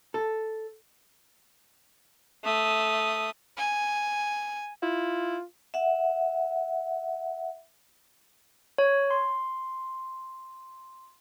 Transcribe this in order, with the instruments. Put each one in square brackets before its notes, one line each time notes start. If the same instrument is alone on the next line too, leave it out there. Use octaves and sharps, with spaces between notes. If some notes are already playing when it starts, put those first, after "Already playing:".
[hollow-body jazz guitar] A4
[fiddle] A3 D#6
[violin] G#5
[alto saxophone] E4 [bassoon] F4
[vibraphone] E5 F#5
[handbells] C#5
C6